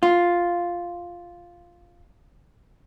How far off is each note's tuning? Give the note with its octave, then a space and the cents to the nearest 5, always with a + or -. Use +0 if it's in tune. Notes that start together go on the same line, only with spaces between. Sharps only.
F4 +0